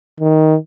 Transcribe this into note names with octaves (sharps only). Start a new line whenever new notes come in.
D#3